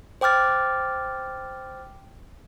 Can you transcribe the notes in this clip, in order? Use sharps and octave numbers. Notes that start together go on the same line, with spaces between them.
C5 G5 D6 F6 A6